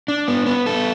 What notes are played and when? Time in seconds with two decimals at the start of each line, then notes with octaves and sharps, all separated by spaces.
0.08 D4
0.28 B3
0.46 B3
0.66 A4